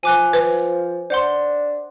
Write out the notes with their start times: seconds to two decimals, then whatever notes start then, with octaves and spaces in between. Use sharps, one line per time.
0.03 F3 G#5 D6 F#6
0.33 B4
1.10 D4 C5 F#5 C6